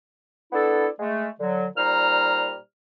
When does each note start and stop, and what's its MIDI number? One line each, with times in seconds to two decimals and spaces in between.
0.52 0.86 59
0.52 0.86 62
0.52 0.86 64
0.52 0.86 69
0.99 1.28 56
0.99 1.28 57
1.39 1.65 50
1.39 1.65 54
1.76 2.55 46
1.76 2.55 55
1.76 2.55 63
1.76 2.55 72
1.76 2.55 82
1.76 2.55 89